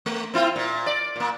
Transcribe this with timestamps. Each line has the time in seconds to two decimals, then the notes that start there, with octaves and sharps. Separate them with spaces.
0.06 A3
0.34 C4 E4 F4
0.56 A#2
0.86 D5
1.16 A#2 A#3